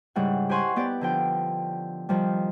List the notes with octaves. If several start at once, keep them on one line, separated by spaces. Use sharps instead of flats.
G#2 C#3 G3 E4 F#5
G4 C5 F#5 G#5 C6 C#6
B3 G4 D5 F#5
D3 F3 G5
D#3 F3 G3